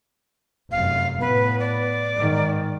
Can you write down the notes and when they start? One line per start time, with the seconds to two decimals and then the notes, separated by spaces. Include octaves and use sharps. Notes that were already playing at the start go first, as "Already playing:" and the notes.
0.71 F1 F#2 F5
1.21 A2 B3 B4
1.59 D5
2.17 G#2 D#3